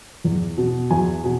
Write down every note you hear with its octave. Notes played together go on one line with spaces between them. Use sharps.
E2
B2
E2 G#5
B2